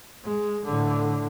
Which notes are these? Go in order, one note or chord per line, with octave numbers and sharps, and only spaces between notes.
G#3
A2 D3